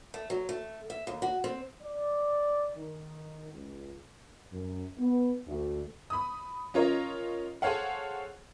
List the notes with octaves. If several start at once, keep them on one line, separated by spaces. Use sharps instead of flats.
A3
F#3
A3
E5
D#2
F#4
C4
D5
D#3
C#2
F#2
B3
D2
B5 D#6
C#4 F4 A#4 C#5 D#5
G#4 A4 C5 C#5 F5 F#5